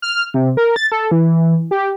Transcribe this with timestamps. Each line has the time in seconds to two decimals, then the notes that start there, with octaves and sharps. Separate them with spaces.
0.02 F6
0.34 C3
0.57 A#4
0.76 A6
0.92 A4
1.11 E3
1.71 G4